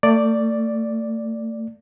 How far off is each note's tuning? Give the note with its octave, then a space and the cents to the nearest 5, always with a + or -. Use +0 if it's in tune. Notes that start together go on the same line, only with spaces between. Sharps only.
A3 +35 D5 +0